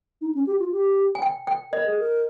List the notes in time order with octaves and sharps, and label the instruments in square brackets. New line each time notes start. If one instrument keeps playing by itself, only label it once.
[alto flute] D#4
C#4
G4
F4
G4
[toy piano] G#5
G5
G5
[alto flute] A#4 [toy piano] D#5
[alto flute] G#4
A#4